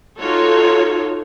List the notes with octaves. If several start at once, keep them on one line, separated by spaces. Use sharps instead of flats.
D#4 F4 F#4 A4 C#5